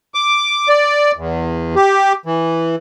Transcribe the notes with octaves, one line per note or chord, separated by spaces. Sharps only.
D6
D5
E2
G4
E3